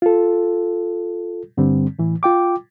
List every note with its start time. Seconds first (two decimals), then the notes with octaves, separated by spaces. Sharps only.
0.02 F4 A4
1.57 G2 D3 G3 C4
1.99 A2 E3
2.23 F4 G5 D6